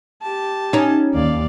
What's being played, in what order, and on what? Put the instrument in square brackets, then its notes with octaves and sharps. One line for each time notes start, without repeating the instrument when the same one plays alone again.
[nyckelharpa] G4 A5
[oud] C#4 D#4
[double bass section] D#2 [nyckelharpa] D5 F5